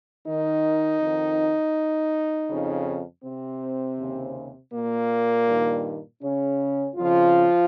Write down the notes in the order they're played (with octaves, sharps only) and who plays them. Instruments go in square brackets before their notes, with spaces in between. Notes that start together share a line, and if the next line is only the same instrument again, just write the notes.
[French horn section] D#3 D#4
F2 D#3
F2 C#3
C3 C4
D#2 C#3
A#2 A#3
G2 D#3
C#3 C#4
F2 C#3 F3 F4